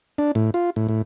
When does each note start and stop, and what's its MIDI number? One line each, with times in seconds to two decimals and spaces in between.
0.18 0.32 62
0.35 0.50 45
0.54 0.70 65
0.76 0.88 45
0.89 1.02 45